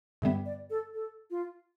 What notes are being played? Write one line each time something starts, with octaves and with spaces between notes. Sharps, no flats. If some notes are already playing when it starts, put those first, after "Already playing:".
G2 D3 G3 B3 E5
D5
A4
A4
F4